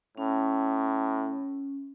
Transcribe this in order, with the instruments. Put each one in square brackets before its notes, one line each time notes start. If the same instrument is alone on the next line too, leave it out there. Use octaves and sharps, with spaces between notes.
[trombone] A2 [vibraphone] C#4